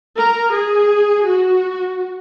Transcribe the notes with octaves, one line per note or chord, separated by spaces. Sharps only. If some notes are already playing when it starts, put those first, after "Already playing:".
A#4
G#4
F#4